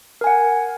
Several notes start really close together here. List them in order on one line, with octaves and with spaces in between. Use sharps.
A#4 G#5 F#5